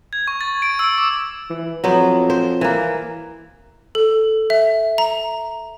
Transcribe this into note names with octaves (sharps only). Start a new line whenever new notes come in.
G#6
C#6
A6
D7
E6
D6
E3
F2 F#3 B3 C5
C5
E3 A#3
A4
E5
A#5